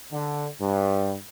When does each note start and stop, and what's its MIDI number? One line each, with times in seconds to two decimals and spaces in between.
0.12 0.47 50
0.61 1.16 43